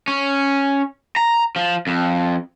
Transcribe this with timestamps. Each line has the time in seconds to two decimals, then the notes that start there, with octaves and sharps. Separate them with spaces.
0.08 C#4
1.16 A#5
1.56 F3
1.87 F2